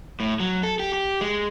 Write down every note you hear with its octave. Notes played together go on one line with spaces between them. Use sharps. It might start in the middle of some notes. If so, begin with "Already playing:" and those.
A2
F#3
A4
G4
G4
G#3